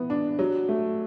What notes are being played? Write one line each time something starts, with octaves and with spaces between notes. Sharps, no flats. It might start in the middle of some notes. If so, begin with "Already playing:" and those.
Already playing: E3 B3
D4
F#3
A3